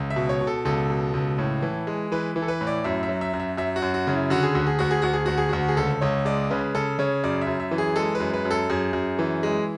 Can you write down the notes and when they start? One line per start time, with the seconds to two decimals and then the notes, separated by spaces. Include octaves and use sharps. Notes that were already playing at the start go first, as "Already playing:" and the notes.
Already playing: C#2
0.10 E5
0.16 B2
0.29 C#5
0.41 B2
0.47 A4
0.65 C#2 A4
0.90 B2
1.13 C#2
1.38 A2
1.62 E3
1.87 G#3
2.12 E3 B4
2.36 E3
2.42 A4
2.48 B4
2.61 A2
2.67 D5
2.84 F#2 E5
3.03 E5
3.09 F#3
3.21 E5
3.34 F#2
3.40 E5
3.57 F#2 E5
3.76 F#4
3.82 F#2
3.94 F#4
4.07 C#3
4.13 E4
4.30 D3 F#4
4.43 G#4
4.55 D2 F#4
4.67 G#4
4.79 D2 F#4
4.91 G#4
5.02 D2 F#4
5.13 G#4
5.26 D2 F#4
5.38 G#4
5.49 D2 F#4
5.69 G#4
5.77 C#2 A4
6.01 C#2 C#5
6.25 G#3 D5
6.51 C#3 B4
6.75 C#3 A4
6.99 C#3 C#5
7.24 F#2 D5
7.42 E5
7.47 F#2
7.60 E5
7.71 E3
7.78 G#4
7.96 G#3 A4
8.15 B4
8.20 F#2
8.33 B4
8.45 F#2
8.51 A4
8.70 F#2 G#4
8.93 F#2
9.19 E3
9.43 G#3